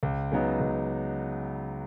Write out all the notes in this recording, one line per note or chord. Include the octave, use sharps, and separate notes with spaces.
C#2
C#3 F#3 B3 D#4
C#2